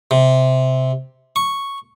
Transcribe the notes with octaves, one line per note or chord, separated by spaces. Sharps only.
C3
C#6